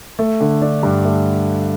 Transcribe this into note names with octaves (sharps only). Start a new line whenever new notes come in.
A3
D3
D4
G2
A3